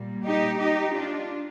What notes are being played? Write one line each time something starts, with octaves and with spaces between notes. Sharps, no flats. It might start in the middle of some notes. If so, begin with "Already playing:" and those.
Already playing: A#2 G3 A#3
D#4 G4
D#4 G4
D4 F4